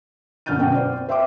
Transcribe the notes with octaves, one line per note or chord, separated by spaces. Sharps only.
F#2 D3 F6 G6 A6 D#7
F#2 B2 F#5 G5
C5 D5
C4
C5 E5 G5 C6 D6